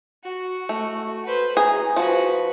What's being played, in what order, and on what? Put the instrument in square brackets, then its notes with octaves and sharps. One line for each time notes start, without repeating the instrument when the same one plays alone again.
[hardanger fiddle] F#4
[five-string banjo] A3
[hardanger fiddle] B4 C5
[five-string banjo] G#4 [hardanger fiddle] A#5
[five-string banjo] F3 [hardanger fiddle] F#4 B4